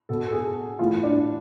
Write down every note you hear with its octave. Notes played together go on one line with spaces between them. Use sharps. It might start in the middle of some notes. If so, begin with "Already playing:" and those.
B2 A4
A4
G#4
A2 E3 F4
D4